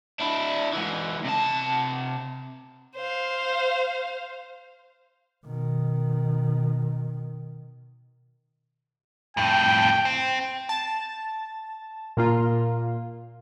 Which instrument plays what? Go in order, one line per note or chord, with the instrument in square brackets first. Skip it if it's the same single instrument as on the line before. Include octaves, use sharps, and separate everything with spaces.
[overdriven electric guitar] D4 E4
G#2 E3
C3 A5
[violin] C5 F5
[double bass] B2 D#3
[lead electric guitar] F2 A2 [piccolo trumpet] G5
[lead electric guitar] C4
[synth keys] A5
A#2 A#3 F4